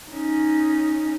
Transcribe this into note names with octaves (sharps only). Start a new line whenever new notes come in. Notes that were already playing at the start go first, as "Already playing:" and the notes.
C#4 D#4